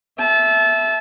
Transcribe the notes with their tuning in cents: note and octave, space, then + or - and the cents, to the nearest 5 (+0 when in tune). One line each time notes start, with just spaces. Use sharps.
E5 +0 A5 -25